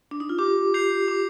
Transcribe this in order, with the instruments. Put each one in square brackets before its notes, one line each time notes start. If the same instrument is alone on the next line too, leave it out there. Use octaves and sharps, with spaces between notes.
[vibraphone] D4
D#4
F4
[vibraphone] G4 [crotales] D6
[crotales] G6 C7 F7
D6